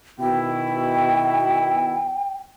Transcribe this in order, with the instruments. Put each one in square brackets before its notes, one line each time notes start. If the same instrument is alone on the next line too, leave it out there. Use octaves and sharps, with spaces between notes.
[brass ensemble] B2 D#3 E4 [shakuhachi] G5